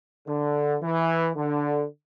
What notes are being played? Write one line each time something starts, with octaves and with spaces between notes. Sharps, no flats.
D3
E3
D3